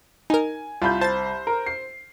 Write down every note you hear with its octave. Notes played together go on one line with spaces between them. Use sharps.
D#4 A#4 G#5
C2 F4 B5 G6
C5 A5 A6
A#4
C7